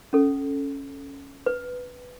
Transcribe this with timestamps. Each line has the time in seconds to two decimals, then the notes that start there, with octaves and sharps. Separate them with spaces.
0.13 C#4 A4
1.46 B4